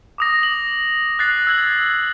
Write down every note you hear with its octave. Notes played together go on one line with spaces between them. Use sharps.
D6 D#6 A#6
F#7
F#6 A6 C7
E6 G#6 F#7